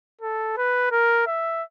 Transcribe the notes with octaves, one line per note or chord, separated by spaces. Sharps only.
A4
B4
A#4
E5